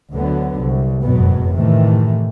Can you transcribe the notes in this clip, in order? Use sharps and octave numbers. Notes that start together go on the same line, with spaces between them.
D2 D3 F#3 B3
C2
F#1 F2 G#2 B2 F#3 B3
A2 C3 D#3 E3 A3